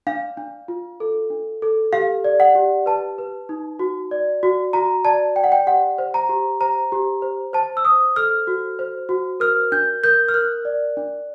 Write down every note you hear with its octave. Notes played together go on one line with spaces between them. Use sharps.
D4 F5
D4
F4
A4
D4
A4
G4 F5
D5
F#5
G4
B4 A5
B4
D#4
F#4
D5
F#4
F#4 A#5
D5 A5
D5 G5
F#5
G5
G4 F#5
C5
A#5
G4
C5 A#5
G4
C5
C5 A5
E6
C5 D#6
A4 F6
F#4
C5
F#4
A#4 F6
D4 G6
A#4 G6
F6
A#4 F#6
D5
D4